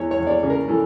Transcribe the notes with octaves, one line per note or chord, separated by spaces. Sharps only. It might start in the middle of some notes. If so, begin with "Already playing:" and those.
Already playing: E2 E3 C#5
C#5
E2
D5
C#5
C#3
A#4
E3 A4